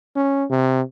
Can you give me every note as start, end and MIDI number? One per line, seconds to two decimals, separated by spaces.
0.16 0.44 61
0.50 0.82 48